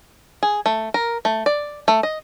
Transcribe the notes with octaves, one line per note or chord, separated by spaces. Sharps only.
G#4
A3
A#4
A3
D5
A3
D#5